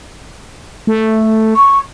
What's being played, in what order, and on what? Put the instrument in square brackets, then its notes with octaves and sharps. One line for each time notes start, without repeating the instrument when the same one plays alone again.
[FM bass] A3
[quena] C#6